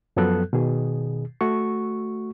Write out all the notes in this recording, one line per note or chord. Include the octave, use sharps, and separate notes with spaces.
F#2 F3 F#3 B3 A4 F#6
B2 D#3 G#4
A3 F#4 C#6